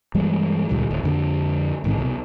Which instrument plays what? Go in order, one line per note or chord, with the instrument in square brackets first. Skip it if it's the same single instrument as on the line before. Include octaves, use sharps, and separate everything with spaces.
[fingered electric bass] G2 E3 G3 G#3
C#2 A#2 D#3 G3
D1
F2 D3 A#3
A1 G#2 D#3 C4
C2 B2